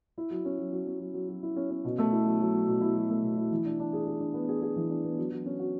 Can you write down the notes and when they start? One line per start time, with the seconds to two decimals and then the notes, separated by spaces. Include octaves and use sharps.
0.18 E4
0.30 F#3
0.45 C#4
0.58 F#3
0.72 F#3
0.87 C#4
1.00 F#3
1.14 F#3
1.29 F#3
1.43 E4
1.56 C#4
1.70 C#4
1.85 B2
1.98 A3
2.12 E4
2.25 F#3
2.40 F#3
2.54 F#3
2.67 B2
2.81 E4
2.96 F#3
3.10 A3
3.23 B2
3.37 E4
3.51 E3
3.65 D4
3.79 D4
3.93 G#4
4.07 G#4
4.20 D4
4.34 B3
4.49 G#4
4.62 G#4
4.76 E3
4.90 D4
5.04 B3
5.18 F#3
5.31 F#3
5.46 C#4
5.59 F#4